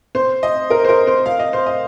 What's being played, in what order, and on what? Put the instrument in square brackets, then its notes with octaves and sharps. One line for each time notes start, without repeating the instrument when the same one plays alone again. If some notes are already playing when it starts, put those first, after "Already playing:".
[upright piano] C5
D#5
A#4
C5
A#4
C5
F5
D#5
C5
D#5